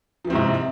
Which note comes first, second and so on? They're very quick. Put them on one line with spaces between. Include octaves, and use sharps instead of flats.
F3 E3 C4 G#2 C3